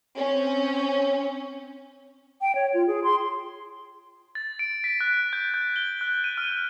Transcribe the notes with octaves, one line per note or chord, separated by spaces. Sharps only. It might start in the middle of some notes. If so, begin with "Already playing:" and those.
C4 C#4
G5
C#5
F4
G#4
C6
A6
D7
B6
F#6
G6
G6
G7
F#6
D#7
F6